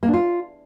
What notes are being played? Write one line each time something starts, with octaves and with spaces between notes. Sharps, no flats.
A#3
D4
F4